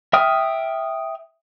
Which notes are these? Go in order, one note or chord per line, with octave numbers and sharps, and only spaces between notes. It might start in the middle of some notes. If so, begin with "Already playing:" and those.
E5 G5 D#6 F6